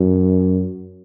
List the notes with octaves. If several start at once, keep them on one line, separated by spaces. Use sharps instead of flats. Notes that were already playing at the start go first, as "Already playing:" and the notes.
Already playing: F#2